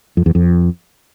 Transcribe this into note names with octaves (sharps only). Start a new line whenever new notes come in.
F2
E2
F2